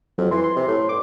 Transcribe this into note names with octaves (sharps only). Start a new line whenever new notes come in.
F2 F#3
E3 C6
C6
C3
A2
G2 D6